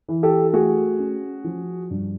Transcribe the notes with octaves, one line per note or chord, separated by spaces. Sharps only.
E3
G4 A4
A3 F#4 G#4
C#4
F3
G2